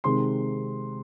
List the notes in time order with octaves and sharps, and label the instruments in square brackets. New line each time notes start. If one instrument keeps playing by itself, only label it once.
[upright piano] C3 D#3 G#3 C4 C6